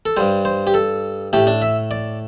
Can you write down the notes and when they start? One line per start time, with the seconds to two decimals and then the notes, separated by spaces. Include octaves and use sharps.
0.06 A4
0.17 G2 G3 C5
0.45 C5
0.67 G4
0.74 A4
1.33 A2 A3 G4
1.47 D4
1.62 E5
1.91 D5